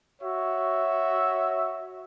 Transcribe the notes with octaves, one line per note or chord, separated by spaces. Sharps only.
F#4 C#5 E5